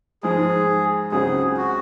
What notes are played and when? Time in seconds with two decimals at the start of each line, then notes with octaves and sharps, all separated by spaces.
0.23 G#2 F3 G#3 G#4
1.12 C#2 C#3 F#3 C4 G#4
1.57 F#4